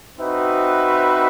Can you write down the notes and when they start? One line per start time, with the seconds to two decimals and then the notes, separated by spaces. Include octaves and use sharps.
0.17 C4 D#4 F#4 B4 E5